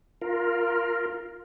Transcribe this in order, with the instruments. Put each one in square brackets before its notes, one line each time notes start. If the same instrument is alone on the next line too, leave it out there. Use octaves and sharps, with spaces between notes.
[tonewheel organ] F4 A#4